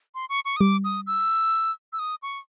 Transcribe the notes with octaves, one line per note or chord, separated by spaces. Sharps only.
C6
C#6
C#6
D#6
G3 D6
D#6
E6
E6
D#6
C#6